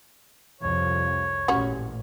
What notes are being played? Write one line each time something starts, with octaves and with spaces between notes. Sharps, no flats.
C2 F2 C#5
A1 A#2 G3 C#4 F#4